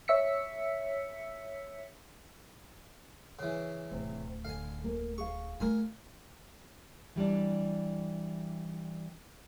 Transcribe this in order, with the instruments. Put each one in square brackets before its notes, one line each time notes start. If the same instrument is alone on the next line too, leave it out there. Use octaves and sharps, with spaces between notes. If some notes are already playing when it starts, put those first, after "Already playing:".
[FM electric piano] C#5 E5 E6 B6 C#7
[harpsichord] C#3 E3
[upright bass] D1 [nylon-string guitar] C3
[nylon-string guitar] D3 [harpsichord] F5 G#5
[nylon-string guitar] A#3
[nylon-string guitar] G#4 F5 [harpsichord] C#6
[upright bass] A3 F4 [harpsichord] A#4 G#5
[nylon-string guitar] E3 G3 C4 D4